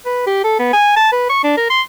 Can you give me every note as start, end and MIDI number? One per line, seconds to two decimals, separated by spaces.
0.05 0.24 71
0.27 0.42 67
0.44 0.56 69
0.59 0.72 59
0.73 0.92 80
0.96 1.10 81
1.12 1.28 71
1.30 1.44 85
1.44 1.57 62
1.57 1.66 70
1.70 1.81 84